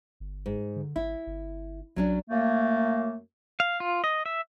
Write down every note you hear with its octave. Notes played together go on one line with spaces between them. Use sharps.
G1
G#2
D3
G#1 E4
G1
B1 F#3 C#4 D4
F#2 A3 A#3
F5
F4
D#5
E5